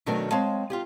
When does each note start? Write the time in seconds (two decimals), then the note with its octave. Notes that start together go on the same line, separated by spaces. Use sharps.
0.06 B2 D#3 F#3 A3 D4 A#4
0.31 G#3 C4 C#5 F5 A5
0.70 F4 G4 G#4